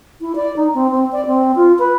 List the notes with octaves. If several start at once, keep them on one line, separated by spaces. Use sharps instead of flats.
E4
D5
D#4
C4
C4
D5
C4
F4
B4